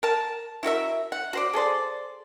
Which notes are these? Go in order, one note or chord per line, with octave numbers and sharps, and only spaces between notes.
A#4 A5
E4 F#4 A#4 E5
F#5
F#4 C5 D5
G#4 A4 C5 D5